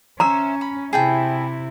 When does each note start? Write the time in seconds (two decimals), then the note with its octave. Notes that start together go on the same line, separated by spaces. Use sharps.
0.20 C#4 C5 E5 A#5
0.61 B5
0.93 C3 E4 G#4 G5 A5